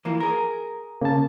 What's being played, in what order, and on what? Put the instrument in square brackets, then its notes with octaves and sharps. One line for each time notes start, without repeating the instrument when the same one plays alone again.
[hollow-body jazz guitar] E3 F3 A#3
G#4 A#4
[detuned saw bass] C#3 [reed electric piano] A#3 A5